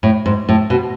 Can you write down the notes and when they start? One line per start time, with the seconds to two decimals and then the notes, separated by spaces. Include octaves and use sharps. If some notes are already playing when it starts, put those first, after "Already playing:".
0.03 A2
0.26 G#2
0.49 A2
0.70 B2